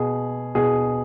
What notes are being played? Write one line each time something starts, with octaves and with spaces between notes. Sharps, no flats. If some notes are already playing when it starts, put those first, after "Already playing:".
Already playing: B2 G#4
B2 G#4